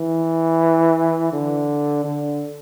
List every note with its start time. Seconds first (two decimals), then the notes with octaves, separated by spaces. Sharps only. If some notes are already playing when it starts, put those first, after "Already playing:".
Already playing: E3
1.33 D3
2.04 D3